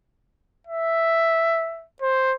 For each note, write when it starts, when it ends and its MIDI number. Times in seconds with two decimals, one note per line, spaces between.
0.67 1.86 76
2.02 2.34 72